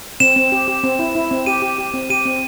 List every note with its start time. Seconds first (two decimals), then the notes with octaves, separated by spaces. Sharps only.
0.20 C4 E7
0.36 C4
0.52 G4
0.68 G4
0.83 C4
0.99 E4
1.15 E4
1.31 C4
1.46 G4 D#7
1.62 G4
1.78 G4
1.94 C4
2.10 G4 D#7
2.26 C4